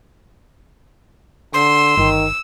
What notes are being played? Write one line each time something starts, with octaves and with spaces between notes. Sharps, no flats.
D3 C6 E6
G1 D#3